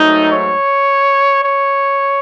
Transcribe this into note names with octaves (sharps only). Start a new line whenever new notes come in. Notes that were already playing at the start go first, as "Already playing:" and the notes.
Already playing: G#2 F#3 A3 D#4
C#5
C#5